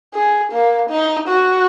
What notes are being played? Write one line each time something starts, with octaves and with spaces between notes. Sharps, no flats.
G#4
A#3
D#4
F#4